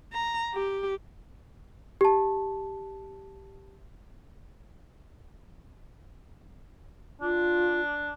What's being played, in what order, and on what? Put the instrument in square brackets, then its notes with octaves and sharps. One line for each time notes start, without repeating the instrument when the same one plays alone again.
[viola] A#5
G4
[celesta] G4 A5
[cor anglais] D4 [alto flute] F4